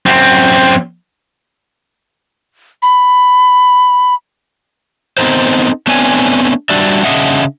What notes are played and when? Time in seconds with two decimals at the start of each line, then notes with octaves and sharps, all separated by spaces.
0.06 F#2 C4
2.82 B5
5.18 B3 C4 D#4 A4 A#4 C5
5.87 A3 B3 C4 D4 C#5 G#5
6.69 G3 D4 F#4 D5 E5
7.04 C#3 C4 D4 D#5 E5 F#5